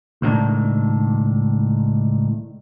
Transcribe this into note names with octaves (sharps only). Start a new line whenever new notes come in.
C#2 A2 D#3 D4